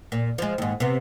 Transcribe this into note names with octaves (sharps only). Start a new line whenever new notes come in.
A#2
F3 G#3
D#2 G#2
C3 B3